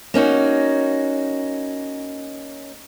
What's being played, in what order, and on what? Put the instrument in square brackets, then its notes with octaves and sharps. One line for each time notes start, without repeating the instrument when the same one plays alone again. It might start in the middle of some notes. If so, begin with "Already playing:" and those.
[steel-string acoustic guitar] A#3 C#4 D#4 F#4